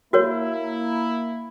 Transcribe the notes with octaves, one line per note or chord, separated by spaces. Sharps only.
A#3 E4 F#4 A#4 C#5